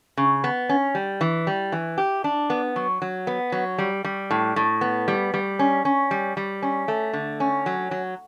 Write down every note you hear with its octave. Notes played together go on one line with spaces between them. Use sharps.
C#3
B3
C#4
G3
E3
G3
E3
G4
D4
B3
F#3
F#3
B3
F#3
G3
G3
A2
A2
B3
G3
G3
C#4
C#4
G3
G3
C#4
A3
D3
C#4
F#3
F#3